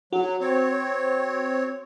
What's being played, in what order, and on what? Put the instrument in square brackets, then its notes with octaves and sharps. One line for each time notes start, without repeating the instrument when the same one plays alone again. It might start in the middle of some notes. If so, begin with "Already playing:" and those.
[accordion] F#3 [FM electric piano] F#4
[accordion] C4 C#5